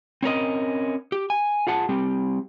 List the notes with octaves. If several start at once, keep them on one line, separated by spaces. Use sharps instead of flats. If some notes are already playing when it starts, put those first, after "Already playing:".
C4 C#4 A#4 D#5
G4
G#5
F4 G#4 F#5 A5
G3 C4 G4